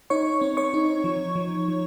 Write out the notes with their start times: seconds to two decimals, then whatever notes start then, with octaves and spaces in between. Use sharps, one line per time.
0.10 D#4 C#5 C#6
0.41 C4
0.57 C#5 C#6
0.74 D#4
1.04 F3
1.36 F3
1.68 F3